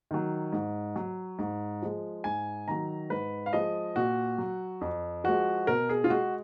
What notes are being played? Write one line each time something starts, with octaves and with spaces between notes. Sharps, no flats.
D#3 F#3
G#2
F#3
G#2
F3 G#3
G#2 G#5
D#3 F#3 A#5
G#2 B4
F5
F3 G#3 D#5
A#2 F#4
F#3
F2
F3 G#3 F#4
B2 A#4
G#4
F4
G#3 F#4